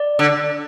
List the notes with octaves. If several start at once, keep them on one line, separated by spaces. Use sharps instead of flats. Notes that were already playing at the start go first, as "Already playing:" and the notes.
Already playing: D5
D3